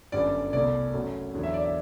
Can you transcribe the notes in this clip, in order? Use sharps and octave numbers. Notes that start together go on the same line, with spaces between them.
G1 F#2 D3 G3 D5
C2 B2 A3 D5
F#2 F#3 A3
E2 D3 F#3
E5
D5
E5